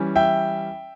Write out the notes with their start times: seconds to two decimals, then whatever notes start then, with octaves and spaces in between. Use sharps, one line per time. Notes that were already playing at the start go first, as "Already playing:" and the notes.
Already playing: E3 G3 C#4
0.16 E5 G5